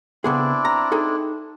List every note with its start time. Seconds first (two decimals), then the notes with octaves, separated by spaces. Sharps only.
0.24 C#3 B3 C4 D4 E4 G#4
0.65 A#5
0.92 D#4 G#4 A4